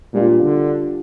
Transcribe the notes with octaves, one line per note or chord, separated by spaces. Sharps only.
A#2 G3 D4 F4
D3